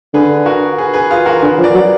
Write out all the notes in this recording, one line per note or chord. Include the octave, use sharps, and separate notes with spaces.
D3 G#4 B4
F#4 A#4
G#4 B4
G#4 B4
F4 G#4
F#4 A#4
D3 G#4 B4
F3
A#4 D5
F#3